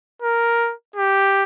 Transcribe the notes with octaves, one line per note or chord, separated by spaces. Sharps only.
A#4
G4